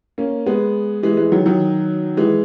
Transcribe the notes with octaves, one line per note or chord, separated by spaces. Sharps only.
A#3 C#4
G#3 B3
E3 G#3
E3 G#3
D#3 F#3
D#3 F#3
E3 G#3